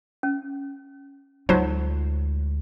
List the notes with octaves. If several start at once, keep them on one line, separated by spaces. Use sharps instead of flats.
C#4
D2 F#3 G#3 D#4 F4 C5 D#5